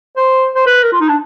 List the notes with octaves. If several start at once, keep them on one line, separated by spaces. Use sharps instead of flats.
C5
C5
B4
A#4
F4
D#4
D4